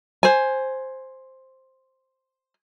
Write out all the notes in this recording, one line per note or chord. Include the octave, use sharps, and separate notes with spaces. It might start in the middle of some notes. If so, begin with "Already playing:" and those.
C5 G#5